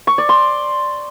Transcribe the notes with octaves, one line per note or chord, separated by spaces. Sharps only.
C#6
D5
C6